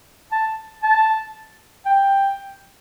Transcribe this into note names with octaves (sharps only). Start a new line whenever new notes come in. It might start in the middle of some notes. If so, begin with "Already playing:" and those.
A5
A5
G5